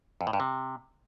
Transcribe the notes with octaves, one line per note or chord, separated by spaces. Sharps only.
F2
A2
G2
C3